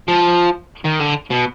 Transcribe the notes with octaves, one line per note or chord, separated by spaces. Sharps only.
F3
D#3
D3
B2